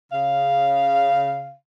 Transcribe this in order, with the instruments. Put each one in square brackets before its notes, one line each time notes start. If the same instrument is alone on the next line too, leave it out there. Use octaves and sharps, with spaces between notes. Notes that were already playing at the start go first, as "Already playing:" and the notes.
[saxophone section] C#3 F5